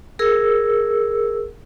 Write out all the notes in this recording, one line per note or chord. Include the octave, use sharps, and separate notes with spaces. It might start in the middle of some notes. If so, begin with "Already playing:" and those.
G#4 A#4 E6